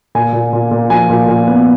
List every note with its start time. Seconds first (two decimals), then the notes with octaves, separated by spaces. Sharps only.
0.15 A#2 G#5
0.33 A#2
0.53 A#2
0.71 A#2
0.90 F3 G#5
1.10 A#2
1.28 A#2
1.47 B3